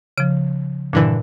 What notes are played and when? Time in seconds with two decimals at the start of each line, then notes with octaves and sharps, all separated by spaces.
0.18 C#3 F3 D7
0.93 G2 A#2 D3 E3